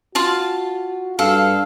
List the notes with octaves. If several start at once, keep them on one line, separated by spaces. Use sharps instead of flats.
F4 F#4 F5 A5
G2 A4 F5